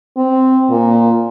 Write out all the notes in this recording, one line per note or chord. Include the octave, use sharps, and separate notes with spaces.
C4
A#2